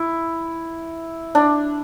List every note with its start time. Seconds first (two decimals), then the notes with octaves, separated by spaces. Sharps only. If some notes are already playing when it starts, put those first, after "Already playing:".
Already playing: E4
1.35 D4